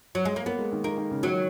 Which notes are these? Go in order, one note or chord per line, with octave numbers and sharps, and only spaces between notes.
F#3
G#3
A#3
A#3 B3
G#3
D#3
D#3 A#3
D#3
C#3
D#3 F#3